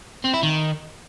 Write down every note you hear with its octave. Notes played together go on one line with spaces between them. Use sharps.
C4
E4
D#3